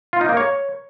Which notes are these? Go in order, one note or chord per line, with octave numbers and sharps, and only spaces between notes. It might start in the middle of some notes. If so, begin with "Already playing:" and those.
F4
D#4
A#3
C#5